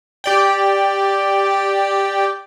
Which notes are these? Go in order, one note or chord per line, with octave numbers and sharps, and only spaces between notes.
G4 D5 G5